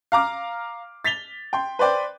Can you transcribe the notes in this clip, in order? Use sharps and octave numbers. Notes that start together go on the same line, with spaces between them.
F5 A#5 D6 F6
A6 B6 F7 G7
G5 C6
B4 C5 D5 G5